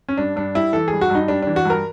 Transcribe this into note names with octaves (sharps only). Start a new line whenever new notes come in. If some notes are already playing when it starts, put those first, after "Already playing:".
C#4
G2 D4
G2 D4
G3 E4
E3 A4
G2 G#4
F#4
G2 D#4
G3 D4
E3 D4
F#4
G2 A#4